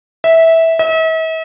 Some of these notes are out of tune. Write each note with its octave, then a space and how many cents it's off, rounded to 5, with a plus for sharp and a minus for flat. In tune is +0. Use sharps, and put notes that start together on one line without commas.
E5 -15
E5 -45